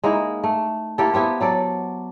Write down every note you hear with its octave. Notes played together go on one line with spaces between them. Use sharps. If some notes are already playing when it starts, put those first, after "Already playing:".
G#3 A#3 D#4 E4
A3
A#3 E4 G4 A4
B3 E4 G4 C5
F#3 A4 D5